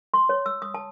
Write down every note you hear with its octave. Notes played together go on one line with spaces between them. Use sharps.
C6
C#5
E6
D#6
A5